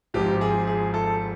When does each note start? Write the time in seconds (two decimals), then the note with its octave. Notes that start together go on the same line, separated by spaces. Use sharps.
0.14 G#1 G#2 F3 G4
0.41 G#4
0.67 G#4
0.94 A4